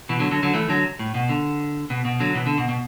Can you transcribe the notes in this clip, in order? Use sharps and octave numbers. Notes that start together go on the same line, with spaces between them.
B2 E3
D3 F#3
D3 F#3
D3 F#3
E3 A3
D3 F#3
A2
B2
D3
B2
B2
D3 F#3
B2 E3
D3
B2
B2